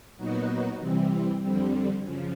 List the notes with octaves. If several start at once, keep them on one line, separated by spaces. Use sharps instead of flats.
A#2 F#3 B3 D#4 F#4
C3 E3 G3 C4
F2 D3 G3 C4
F#2 C#3 F3